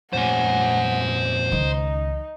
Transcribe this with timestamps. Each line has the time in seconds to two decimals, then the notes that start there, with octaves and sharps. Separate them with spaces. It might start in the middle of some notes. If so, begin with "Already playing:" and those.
0.13 F2 A#2 C#4 C5 F#5 G#5
1.52 C#2 D#3 D#4